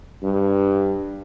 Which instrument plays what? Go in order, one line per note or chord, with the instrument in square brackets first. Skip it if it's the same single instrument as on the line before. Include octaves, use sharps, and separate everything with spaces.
[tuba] G2